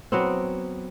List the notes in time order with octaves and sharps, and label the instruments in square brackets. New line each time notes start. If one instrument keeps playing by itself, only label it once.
[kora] F#3 B3 C4